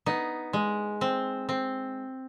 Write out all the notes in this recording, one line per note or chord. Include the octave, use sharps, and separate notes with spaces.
B3 D#4
G#3
C4
C4